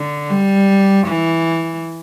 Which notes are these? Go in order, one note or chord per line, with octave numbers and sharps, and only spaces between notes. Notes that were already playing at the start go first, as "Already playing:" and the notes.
Already playing: D3
G3
E3